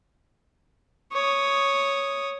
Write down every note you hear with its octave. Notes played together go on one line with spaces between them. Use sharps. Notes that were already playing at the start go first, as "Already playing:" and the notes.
C#5 D#6